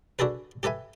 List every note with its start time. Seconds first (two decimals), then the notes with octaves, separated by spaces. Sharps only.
0.19 D4 F#4 G#4 A4 B4
0.63 G4 A4 B4 E5 G#5